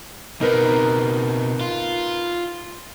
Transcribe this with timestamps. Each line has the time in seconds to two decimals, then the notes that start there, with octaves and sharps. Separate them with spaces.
0.41 B2 C4 D#4 A#4 B4
1.61 F4